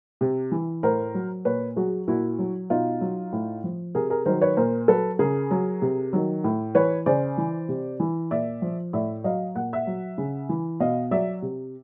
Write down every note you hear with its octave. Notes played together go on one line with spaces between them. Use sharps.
C3
E3
A2 A#4 C5
F#3
A#2 B4 C#5
F#3 F#4 G#4
A#2 E4 F#4
F#3
B2 D#4 F4
F#3
A2
F3
C3 G#4 A#4
G#4 A#4
D#3 F#3 A#4 C5
B4 C#5
A#2 A#4 C5
F#3 A4 B4
C#3 G#4 A#4
F#3
C3
D#3 F#3
A2
E3 B4 C#5
C#3 C5 D5
E3
C3
E3
A#2 D5 E5
F3
A2 D5 E5
F#3 D#5 F5
A#2 F#5
E5 F#5
F#3
C#3
E3
B2 D#5 F5
F#3 D5 E5
C3